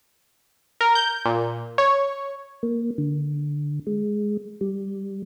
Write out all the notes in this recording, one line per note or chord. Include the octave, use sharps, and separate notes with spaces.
A#4
G6
A#2
C#5
A#3
D3
G#3
G3